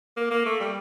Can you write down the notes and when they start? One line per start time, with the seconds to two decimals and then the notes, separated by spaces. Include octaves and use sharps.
0.17 A#3
0.31 A#3
0.46 A3
0.60 G3